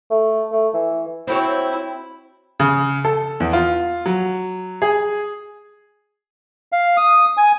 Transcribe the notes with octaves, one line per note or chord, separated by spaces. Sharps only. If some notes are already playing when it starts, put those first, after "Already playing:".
A3
A3
E3
C4 E4 F#4 C#5
C#3
A4
E2
F4
F#3
G#4
F5
D#6
G#5